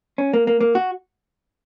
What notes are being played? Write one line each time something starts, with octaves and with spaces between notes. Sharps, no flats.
C#4
A#3
A#3
A#3
F#4